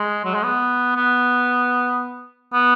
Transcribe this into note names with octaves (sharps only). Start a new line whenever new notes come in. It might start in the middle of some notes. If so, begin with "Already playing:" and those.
Already playing: G#3
F#3
G#3
B3
B3
B3